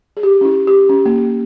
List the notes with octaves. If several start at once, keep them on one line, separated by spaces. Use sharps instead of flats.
G#4
G4
C#4
E4
G4
C#4
A#3